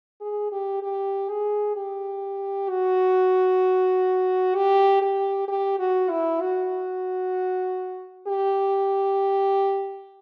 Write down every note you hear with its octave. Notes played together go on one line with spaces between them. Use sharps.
G#4
G4
G4
G#4
G4
F#4
G4
G4
G4
F#4
E4
F#4
G4